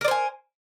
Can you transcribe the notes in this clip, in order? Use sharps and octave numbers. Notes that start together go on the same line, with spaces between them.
A#4 C5 D5 G#5